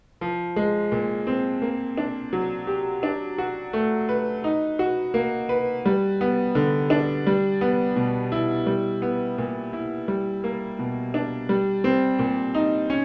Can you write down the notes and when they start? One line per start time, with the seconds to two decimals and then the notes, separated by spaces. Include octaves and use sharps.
0.21 F3
0.56 G#3
0.92 A#2
1.27 C4
1.62 A#3
1.97 D4
2.33 F#3
2.67 G4
3.03 D4
3.38 F#4
3.73 A3
4.09 B4
4.44 D#4
4.79 F#4
5.14 A#3
5.49 B4
5.86 G3
6.21 B3
6.55 D3
6.90 D4
7.27 G3
7.61 B3
7.96 B2
8.32 E4
8.66 G3
9.02 B3
9.38 A#2
9.73 E4
10.08 G3
10.44 A#3
10.79 B2
11.14 D4
11.49 G3
11.84 C4
12.19 A#2
12.54 D#4
12.90 C#4